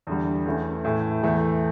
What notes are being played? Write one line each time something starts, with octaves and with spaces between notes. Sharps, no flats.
E2 D3 G3
E2 E3 A3 C#4
A2 E3 A3 E4
E2 E3 A3